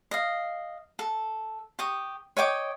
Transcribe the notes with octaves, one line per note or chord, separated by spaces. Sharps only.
D#5 F5
A4
G4 C#6 D#6
C#5 D#5 G5 D6